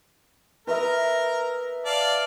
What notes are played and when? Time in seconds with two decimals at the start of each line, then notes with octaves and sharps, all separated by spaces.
0.67 A#4 B4 D#5 E5
1.85 D5 F5 A5